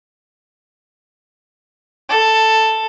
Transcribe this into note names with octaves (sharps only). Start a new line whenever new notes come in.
A4